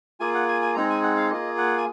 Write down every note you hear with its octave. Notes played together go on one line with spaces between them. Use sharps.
A#3 F4 G#4 G#5
F#5
G#5
G#5
G#3 C4 D#4 G#4 A#5
G#5
F#5
F5
A#3 F4 G#4 D#5
F#5
G#5